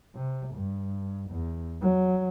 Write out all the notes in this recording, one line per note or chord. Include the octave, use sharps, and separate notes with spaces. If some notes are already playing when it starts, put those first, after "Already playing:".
C3
G2
E2
F#3